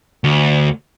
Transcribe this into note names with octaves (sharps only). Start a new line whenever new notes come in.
D2